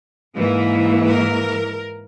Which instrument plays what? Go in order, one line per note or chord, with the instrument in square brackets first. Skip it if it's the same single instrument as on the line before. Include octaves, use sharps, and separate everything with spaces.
[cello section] G#2 E3 A#3
A#4